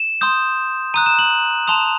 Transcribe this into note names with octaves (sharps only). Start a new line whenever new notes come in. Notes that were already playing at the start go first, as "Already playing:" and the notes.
Already playing: E7
C6 D#6 G6
A#5 D#6 F#6 D#7
E7
F#7
A5 C6 D#6 F7